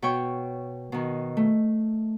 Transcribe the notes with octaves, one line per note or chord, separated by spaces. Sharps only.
B2 C#5 G5 C#6
B2 D#3
A3